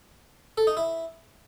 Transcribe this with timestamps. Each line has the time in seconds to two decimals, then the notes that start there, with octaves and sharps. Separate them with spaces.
0.58 A4
0.67 D#4
0.77 E4